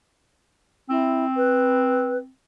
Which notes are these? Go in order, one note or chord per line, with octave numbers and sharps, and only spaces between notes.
C4 E4
B4